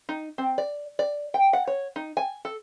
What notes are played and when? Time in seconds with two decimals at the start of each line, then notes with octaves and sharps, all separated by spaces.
0.09 D#4
0.38 C4
0.58 D5
0.99 D5
1.34 G5
1.53 F#5
1.67 C#5
1.96 D#4
2.17 G#5
2.45 A4